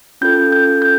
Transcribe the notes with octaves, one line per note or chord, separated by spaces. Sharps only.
C#4 F4 A4 G6
G6
G6